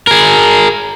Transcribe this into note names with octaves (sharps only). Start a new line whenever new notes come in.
G#4 A#4